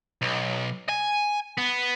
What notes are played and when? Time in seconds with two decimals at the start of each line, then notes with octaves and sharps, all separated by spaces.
0.22 B1
0.89 G#5
1.58 B3